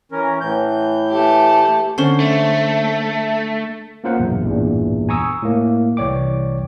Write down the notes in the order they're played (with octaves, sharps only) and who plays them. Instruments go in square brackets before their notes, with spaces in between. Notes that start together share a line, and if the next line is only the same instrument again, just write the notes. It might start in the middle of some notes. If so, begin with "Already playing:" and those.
[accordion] E3 C#4 A#4
A2 E3 G6
[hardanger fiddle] A3 G4
[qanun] D3 C5 [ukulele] C#4
[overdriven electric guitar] A3
[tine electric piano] A#3 C#4 F4 A#4 C5 F#5
B1 E2 G2 A#2
A1 E2 G2 A#2
G#5 A#5 C#6 D#6 E6
A2 A#3
C2 E3 C#5 D5 G5 D6